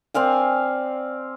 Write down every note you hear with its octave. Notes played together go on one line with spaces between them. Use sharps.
C4 D5 F5 G#5